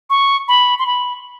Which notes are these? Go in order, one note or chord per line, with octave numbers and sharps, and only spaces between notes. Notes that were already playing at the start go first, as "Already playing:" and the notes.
C#6
B5
C6
B5